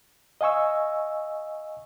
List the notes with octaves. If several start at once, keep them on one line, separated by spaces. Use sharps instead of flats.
D#5 F5 G#5 C#6 E6